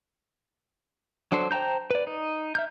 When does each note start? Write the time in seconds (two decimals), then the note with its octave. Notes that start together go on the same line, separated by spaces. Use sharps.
1.32 F#3 D4 A4 C5
1.51 C5 G5 A5 A#5 G6
1.91 B4 D5
2.07 D#4
2.55 E5 F6 G6